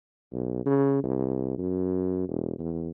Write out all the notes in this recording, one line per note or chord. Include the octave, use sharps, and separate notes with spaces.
B1
C#3
C2
F#2
E1
E2